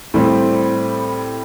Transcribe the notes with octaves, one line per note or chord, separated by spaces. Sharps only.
A2 G3 C4